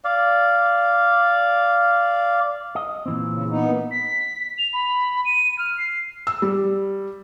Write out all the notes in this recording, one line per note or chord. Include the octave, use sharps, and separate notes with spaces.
D5 F5
D#5
A#2 E3 C4
C#3
B3 D#4
A#3
B6
F7
B5
D#7
F6
C7
E6
G3